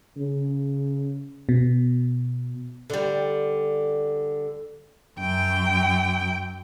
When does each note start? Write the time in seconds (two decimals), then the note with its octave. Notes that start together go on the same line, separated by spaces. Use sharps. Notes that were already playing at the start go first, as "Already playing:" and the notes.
0.17 C#3
1.49 B2
2.90 D3 G3
5.19 F#2 G5